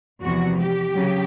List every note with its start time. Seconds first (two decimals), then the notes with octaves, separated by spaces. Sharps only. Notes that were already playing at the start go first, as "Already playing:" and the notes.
0.23 E2 C3 F3 F#4
0.59 G4
0.95 C#3 F#3